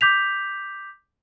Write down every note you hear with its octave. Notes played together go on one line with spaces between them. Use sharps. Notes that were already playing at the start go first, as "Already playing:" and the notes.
D6 G6 B6 F7